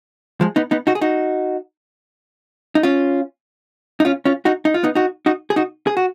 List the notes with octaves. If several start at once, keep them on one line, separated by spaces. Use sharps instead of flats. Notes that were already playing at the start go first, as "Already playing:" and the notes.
F3 G#3
B3 D#4
B3 D#4
D#4 F#4
G#4
D#4 F#4
D#4
C#4 F4
D#4
C#4 F4
C#4 F4
D#4 F#4
D#4
F4
B3 D#4
D#4 F#4
D#4 F#4
G#4
D#4 F#4
G#4
F#4